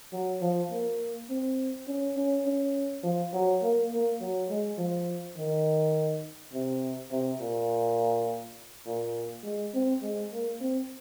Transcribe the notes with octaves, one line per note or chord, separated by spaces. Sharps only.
F#3
F3
A#3
C4
C#4
C#4
C#4
F3
F#3
A#3
A#3
F#3
G#3
F3
D#3
C3
C3
A#2
A#2
G#3
C4
G#3
A#3
C4